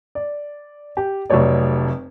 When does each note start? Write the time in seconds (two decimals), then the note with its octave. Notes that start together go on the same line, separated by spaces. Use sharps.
0.15 D5
0.97 G4
1.30 F1 F2 F#3 A3 C#5 D5